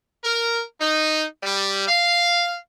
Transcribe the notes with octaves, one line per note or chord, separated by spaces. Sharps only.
A#4
D#4
G3
F5